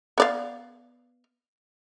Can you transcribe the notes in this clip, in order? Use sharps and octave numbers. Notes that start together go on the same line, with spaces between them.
B3 D5 F5